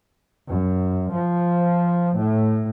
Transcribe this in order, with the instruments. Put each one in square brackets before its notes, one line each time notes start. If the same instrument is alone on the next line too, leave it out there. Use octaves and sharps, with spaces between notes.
[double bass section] F#2
F3
A2